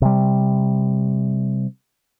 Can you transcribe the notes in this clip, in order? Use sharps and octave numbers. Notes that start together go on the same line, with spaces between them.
C3 G3